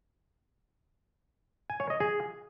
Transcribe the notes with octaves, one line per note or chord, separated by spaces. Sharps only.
G#5
C#5
D#5
G#4